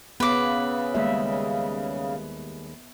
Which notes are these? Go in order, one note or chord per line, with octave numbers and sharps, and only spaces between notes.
C#3 B3 B4 D6
D#2 G3 G#3 E5